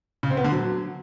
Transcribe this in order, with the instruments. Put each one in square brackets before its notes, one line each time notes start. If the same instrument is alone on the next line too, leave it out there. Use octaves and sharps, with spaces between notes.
[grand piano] C#3
C4
B3
D3
F#3